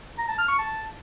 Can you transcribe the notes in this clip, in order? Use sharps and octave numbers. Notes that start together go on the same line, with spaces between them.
A#5
A5
F6
C#6
A5